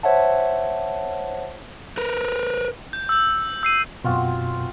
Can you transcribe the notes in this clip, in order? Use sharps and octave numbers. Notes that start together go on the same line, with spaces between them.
C5 C#5 E5 F#5 A5
A#4 B4
G6
E6 G6
E6 C7 D#7
F#2 B2 C4 F4 F#4